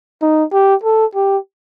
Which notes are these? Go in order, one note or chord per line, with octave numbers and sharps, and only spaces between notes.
D#4
G4
A4
G4